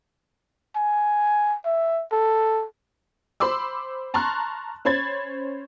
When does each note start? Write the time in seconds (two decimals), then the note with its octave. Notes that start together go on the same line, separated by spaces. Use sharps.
0.76 G#5
1.65 E5
2.12 A4
3.40 C5 B5 C6 D6 E6
4.14 A5 A#5 C6 C#6 F6 F#6
4.85 C#4 C5 B5 G#6 A6